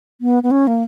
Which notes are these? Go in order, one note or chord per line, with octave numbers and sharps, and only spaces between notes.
B3
B3
C#4
A#3